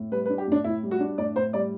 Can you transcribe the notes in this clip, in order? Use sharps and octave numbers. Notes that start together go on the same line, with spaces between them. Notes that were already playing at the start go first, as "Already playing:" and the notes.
Already playing: A2
G3 B4
B4
D4
G4
A2 D4
A2 E4
G3
F#4
D4
A2 D5
A2 C5
G3 D5